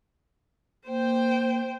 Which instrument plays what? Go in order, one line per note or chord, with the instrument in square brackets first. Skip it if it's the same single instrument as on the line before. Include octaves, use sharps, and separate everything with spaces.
[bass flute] A#3 [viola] C5 G5